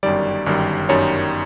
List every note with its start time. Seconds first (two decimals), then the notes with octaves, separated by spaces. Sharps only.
0.03 G1 F#2 D#3 G3 D5
0.46 G1 F#2 D#3 G3
0.89 G1 F#2 D#3 G3 C#5